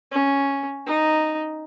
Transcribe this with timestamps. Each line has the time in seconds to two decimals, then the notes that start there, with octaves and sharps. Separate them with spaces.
0.11 C#4
0.87 D#4